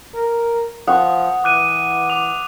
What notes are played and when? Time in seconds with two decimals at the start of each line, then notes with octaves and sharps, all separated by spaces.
0.14 A#4
0.88 F3 F#5 C#6 D#6
1.44 E3 D6 F#6 D#7
2.10 D6 F7